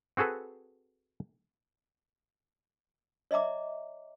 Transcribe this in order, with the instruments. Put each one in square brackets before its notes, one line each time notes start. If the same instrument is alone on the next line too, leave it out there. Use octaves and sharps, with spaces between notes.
[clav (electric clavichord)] C4 F#4 G#4 A4 B4
[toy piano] C#5 D#5 E5 A#5 D6